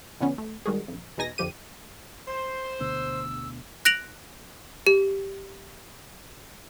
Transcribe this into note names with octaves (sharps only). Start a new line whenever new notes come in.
F2 D3 B3 C#4
A3
G#2 D#3 G3 F#4 G#4
A#1 F2
E2 B2 D#4 G#5 A#6
F2 D3 F3 G4 D#7
C5 C6
D2 B2 D3 E6
F#6 A#6 D7 F7 F#7
G4